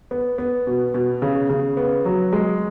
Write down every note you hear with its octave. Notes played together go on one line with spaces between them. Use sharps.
B3
B3
B2
B2
C#3
C#3
B3
F#3
G#3